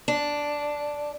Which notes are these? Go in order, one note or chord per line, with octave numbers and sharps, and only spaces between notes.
D4